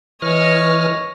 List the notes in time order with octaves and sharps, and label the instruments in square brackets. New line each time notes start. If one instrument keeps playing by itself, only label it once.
[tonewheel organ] E3 F6 [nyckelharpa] C#5 D#5